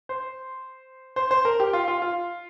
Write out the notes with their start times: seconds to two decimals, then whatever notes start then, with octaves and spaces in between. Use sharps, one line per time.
0.09 C5
1.16 C5
1.31 C5
1.45 A#4
1.60 G4
1.73 F4
1.88 F4
2.02 F4